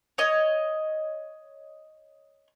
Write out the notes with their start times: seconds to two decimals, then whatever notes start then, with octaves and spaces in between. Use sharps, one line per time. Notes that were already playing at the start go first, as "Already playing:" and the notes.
0.18 C#5 D#5